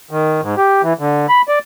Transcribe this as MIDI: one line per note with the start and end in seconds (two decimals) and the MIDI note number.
0.11 0.41 51
0.42 0.55 44
0.57 0.82 67
0.83 0.93 52
0.99 1.27 50
1.29 1.42 83
1.48 1.59 74